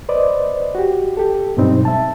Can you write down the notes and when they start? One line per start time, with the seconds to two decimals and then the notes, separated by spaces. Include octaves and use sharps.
0.09 B4 C5 D5 D#5
0.75 F#4 G4
1.17 G4 A4
1.57 G2 B2 F#3 G3 C4 D#4
1.85 E5 A5